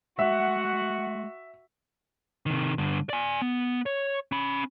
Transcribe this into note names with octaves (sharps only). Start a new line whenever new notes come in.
G#3 A3 F#4 E5 F#5
C3 D#3
G2 D3
D5 G#5
B3
C#5
C#4 B5